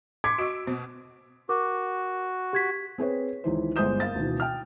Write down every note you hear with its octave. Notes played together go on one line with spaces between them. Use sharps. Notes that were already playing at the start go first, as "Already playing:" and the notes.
C6 D6 G#6 B6 C#7
F#4 D#5 C#6 E6 D7
B2 C5
F#4 A#4 D6
G4 G#6 B6
C4 G#4 B4 C#5
C#2 D#3 E3 C5
G1 G#3 C5 D#6 G6 E7
A#3 F5 A6
D2 B2 D#3 E3
G5 F6